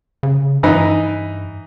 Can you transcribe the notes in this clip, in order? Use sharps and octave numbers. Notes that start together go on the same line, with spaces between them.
C#3
G2 E3 D#4